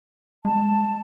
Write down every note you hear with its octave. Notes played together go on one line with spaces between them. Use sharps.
G#3 A5